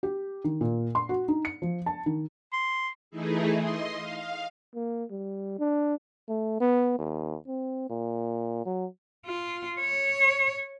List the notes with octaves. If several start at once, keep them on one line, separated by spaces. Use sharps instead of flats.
G4
D#3
A#2
C6
F#4
D#4
C#7
F3
A5
D#3
C6
E3 A3 D#4 E4 G#4
D#5 C6
F5
A#3
G3
D4
A3
B3
D#2
C4
A#2
F#3
F4
C#5